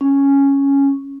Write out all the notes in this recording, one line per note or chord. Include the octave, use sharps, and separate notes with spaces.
C#4